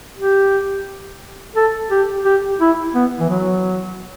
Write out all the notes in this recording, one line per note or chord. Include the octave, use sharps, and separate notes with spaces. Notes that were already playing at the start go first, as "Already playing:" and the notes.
G4
A4
G4
G4
E4
B3
E3
F#3